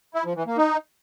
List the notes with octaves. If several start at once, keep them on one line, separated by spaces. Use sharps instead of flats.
E4
F3
E3
A#3
D#4